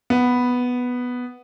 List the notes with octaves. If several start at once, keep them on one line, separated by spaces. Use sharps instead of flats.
B3